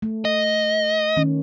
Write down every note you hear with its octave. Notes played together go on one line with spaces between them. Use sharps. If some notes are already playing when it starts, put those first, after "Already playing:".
A3
D#5
D#3 C#4